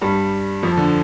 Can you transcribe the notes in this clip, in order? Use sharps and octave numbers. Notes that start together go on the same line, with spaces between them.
G2 G3
F2 F3
D3